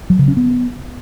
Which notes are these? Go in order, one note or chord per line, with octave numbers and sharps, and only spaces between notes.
F#3
C#3
C#4
B3